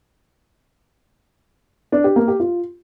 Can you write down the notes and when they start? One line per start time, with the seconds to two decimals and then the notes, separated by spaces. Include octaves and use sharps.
1.92 D4
2.04 G4
2.16 A#3
2.28 G4
2.40 F4